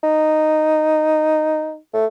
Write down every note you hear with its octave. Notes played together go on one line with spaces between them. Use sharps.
D#4
A3